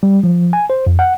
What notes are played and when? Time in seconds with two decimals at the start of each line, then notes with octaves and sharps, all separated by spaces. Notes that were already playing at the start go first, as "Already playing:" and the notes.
0.03 G3
0.24 F3
0.53 G#5
0.70 C5
0.87 F2
0.99 F#5